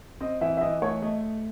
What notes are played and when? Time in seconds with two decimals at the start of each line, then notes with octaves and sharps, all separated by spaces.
0.21 C4 D#5
0.41 E3 E5
0.57 E5
0.61 E3 D#5
0.82 A3 C#5
1.02 A3 D#5